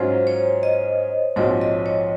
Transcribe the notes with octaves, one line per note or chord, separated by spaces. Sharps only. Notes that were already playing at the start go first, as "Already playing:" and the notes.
Already playing: G#2 F#3 C#4 F4 C5
C#5
D#5
A#1 G#2 F3 C4 F#4 C#5
D#5
C#5